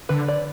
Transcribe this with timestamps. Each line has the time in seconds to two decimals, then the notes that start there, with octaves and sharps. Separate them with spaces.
0.09 D3 B4
0.28 D5